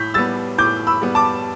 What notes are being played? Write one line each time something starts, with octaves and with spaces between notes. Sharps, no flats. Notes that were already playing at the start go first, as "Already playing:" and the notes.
Already playing: A2 G6 B6
G3 B3 E6 A6
A2 D6 G6
B5 E6
G3 B3
A5 D6